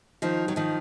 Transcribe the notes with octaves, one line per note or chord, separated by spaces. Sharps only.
D#3 F3
F#3
D#3 F3